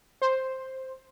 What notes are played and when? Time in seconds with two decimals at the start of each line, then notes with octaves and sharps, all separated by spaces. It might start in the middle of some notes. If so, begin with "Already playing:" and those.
0.22 C5